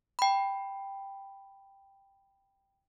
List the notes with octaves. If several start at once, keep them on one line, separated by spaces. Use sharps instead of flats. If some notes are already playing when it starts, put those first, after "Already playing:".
G5 B5